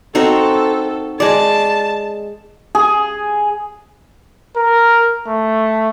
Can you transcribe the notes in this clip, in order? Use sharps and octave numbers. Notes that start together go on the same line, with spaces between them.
C4 D#4 F#4 A4
G#3 D5 A5
G#4
A#4
A3